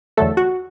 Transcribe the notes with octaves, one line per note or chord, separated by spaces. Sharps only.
E2 D3 F#3 A3 A4
F#4